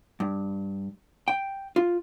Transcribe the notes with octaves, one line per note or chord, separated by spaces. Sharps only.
G2
G5
F4